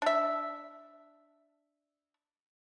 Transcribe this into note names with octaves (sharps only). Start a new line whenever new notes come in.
D4 E5